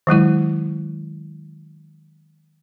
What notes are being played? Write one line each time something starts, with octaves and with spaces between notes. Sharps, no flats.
D#3 F#3 G#3 E4